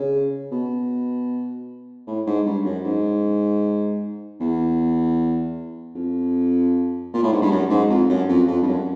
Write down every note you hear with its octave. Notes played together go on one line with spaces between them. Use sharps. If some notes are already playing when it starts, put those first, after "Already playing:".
Already playing: C#3
B2
A2
G#2
G2
F#2
G#2
E2
F2
A#2
A2
G#2
G2
F#2
G#2
F2
F#2
F2
F2
G2
F#2